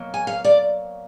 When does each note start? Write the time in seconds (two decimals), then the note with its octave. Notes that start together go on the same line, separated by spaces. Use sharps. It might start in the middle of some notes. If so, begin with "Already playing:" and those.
Already playing: B2 F#3 A#3
0.14 G#5
0.27 F5
0.44 D5